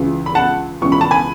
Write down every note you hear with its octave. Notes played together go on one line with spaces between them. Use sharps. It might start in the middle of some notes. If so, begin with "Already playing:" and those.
Already playing: C#2 C#3 E3
B5
F#5 A5
C#2 C#3 E3 C#6
B5
A5
G#5 B5